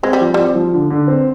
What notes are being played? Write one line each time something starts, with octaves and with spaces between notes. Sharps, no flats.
G#3 C4
G3
F3
G3 C4
F3
D3
D3
C4